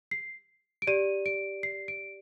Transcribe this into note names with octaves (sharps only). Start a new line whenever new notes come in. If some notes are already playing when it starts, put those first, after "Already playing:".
C7
D7
G4 D5 D#7
D7
C7
D7